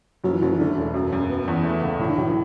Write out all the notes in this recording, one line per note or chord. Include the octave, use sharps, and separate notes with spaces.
F#1 F#3
E3
F#1 F#3
E3
D3 A3
E1
F#2 F#3
F#2
B3
E2
A3
C#2
A2 E3
D3
A2 F#3
E3